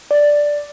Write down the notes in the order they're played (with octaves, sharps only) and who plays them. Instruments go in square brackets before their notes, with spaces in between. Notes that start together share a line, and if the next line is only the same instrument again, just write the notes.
[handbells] D5